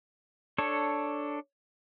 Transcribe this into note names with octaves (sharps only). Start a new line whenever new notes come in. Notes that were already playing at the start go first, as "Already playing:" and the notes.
D4 A4 C#5